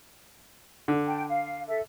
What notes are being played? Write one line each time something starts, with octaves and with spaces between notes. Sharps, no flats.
D3
G5 A5
F5
A4 E5